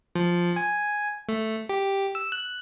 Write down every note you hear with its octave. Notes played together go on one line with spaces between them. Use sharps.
F3
G#5
A3
G4
E6
F#6